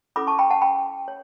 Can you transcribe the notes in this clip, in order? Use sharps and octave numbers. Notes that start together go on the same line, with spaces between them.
C#4 E4 A4 B5 D6
A5 C#6
G5 B5
F#5 A5
G5 B5
C#5